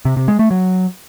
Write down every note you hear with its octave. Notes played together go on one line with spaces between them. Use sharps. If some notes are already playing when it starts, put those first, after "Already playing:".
C3
C3
G#3
A3
F#3